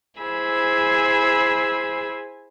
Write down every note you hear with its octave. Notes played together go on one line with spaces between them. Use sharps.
E4 G#4 C5 G#5 B5 E6